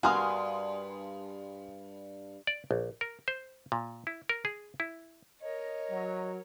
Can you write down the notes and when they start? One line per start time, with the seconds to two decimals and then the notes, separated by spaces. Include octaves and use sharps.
0.03 G2 F#4 A#4 F5 G#5 C6 D#6
2.47 D5
2.71 A#1
3.01 A#4
3.28 C5
3.72 A#2
4.07 E4
4.29 A#4
4.45 G#4
4.80 E4
5.41 A#4 C#5 D#5
5.90 F#3